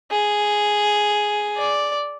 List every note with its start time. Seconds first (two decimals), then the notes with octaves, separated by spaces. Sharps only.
0.11 G#4
1.57 D5